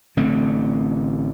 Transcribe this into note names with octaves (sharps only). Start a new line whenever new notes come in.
A1 D3 A3 C4